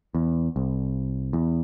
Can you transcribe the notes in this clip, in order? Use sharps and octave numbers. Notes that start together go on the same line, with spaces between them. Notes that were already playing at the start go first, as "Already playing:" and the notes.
E2
C2
E2